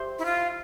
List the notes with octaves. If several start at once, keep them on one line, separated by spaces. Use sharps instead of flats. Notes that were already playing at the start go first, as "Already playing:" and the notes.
Already playing: G4 C5 E5
E4
F4